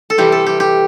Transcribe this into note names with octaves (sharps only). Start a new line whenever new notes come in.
A4
C3 E3 G3 G4
A4
G4
G4